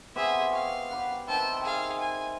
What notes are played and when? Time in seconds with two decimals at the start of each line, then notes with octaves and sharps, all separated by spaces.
0.16 B3 C4 G4 G#4 E5
0.53 F5 C#6
0.91 G4 B4 F#5
1.28 D#3 C4 E4 G5 A5
1.63 G#4 F5
2.00 G#5